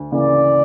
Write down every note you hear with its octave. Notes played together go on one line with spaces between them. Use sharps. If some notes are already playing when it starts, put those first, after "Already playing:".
Already playing: D2
C#3 E3 A#3 D5